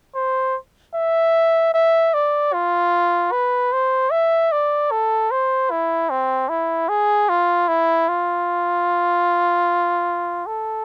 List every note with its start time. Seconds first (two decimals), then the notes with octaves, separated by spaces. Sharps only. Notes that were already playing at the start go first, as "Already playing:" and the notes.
0.15 C5
0.95 E5
1.74 E5
2.14 D5
2.53 F4
3.32 B4
3.73 C5
4.11 E5
4.52 D5
4.91 A4
5.31 C5
5.71 E4
6.10 C4
6.49 E4
6.89 G#4
7.29 F4
7.68 E4
8.09 F4
10.46 A4